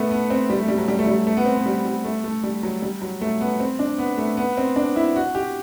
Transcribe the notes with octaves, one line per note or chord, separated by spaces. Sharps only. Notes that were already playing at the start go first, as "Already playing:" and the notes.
Already playing: A3 B3
B3
C4
G3
A3
G3
F#3
G3
A3
G3
A3
B3
C4
B3
G3
G3
A3
A3
G3
F#3
G3
F#3
A3
B3
C4
D4
B3
A3
B3
C4
D4
E4
F#4
G4